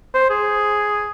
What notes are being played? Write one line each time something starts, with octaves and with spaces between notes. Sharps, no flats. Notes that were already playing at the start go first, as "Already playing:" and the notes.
C5
G#4